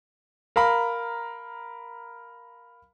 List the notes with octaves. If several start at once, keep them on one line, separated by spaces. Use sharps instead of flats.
A#4 F5 A#5 B5